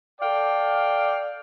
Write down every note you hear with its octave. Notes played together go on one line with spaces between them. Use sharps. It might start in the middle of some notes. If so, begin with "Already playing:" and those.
A4 D5 F5 G5